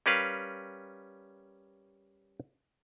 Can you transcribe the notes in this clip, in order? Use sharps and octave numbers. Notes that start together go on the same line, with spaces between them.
G3 C#4 A#4 B4 F5